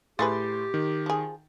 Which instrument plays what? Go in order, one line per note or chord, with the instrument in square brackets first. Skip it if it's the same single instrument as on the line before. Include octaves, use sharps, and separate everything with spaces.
[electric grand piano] A2 C6 A6 [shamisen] A3 G#4 B4 [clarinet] G4
[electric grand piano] D#3
[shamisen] F3 G#4